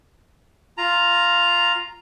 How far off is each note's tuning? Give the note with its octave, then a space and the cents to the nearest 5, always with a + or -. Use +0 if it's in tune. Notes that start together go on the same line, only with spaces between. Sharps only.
F4 +0 A#5 +0